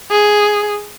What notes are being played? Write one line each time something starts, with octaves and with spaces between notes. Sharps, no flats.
G#4